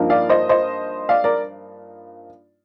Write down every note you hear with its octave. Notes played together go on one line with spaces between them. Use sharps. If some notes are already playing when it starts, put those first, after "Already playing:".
Already playing: G2 F3 A#3 D#4
D5 F5
C5 D#5
C5 D#5
D5 F5
A#4 D5